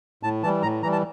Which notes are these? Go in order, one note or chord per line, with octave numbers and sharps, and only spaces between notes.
A2 A5
E3 G3 A5
A2 A#5
E3 G3 A#5
A5